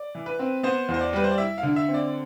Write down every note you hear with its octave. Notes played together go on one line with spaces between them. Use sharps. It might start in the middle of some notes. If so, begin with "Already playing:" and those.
Already playing: D5
E3
B4
C4
B3 C5
E2
C5
D5
G3 B4
C5
D5
E4 E5
F5
D3
E5
C4
D5